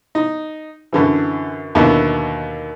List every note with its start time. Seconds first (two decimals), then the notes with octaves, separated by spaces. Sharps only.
0.15 D#4
0.93 F#2 D3 E3
1.75 D#2 B2 D3 E4